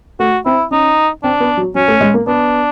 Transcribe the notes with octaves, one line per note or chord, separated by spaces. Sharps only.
A3 F#4
C4 E4
C#4 D#4
C4 D4
B3
F#3
F#3 C#4
A3
G#3
A#3
B3 D4